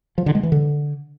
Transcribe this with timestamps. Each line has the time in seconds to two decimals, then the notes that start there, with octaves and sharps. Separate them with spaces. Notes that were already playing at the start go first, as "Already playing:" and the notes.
0.18 F3
0.26 D3
0.35 G#3
0.43 E3
0.52 D3